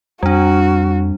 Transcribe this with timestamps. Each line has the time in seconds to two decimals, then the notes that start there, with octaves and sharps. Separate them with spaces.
0.23 F2 G3 D4 F#4